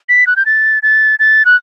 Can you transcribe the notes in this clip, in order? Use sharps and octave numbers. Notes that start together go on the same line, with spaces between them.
B6
F#6
G6
A6
A6
A6
F#6